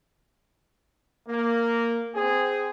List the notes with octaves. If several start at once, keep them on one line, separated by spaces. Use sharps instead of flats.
A#3
C4 G#4